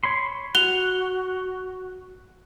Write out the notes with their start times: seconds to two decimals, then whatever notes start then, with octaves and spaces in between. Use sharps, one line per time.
0.04 C#5 B5 C6
0.55 F#4 F#5 F7 G7